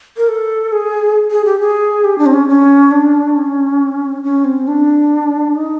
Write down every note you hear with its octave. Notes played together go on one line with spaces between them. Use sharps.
A#4
A4
G#4
G#4
G4
G#4
G4
D4
C4
C#4
C#4
D4
C#4
C#4
C4
D4
D#4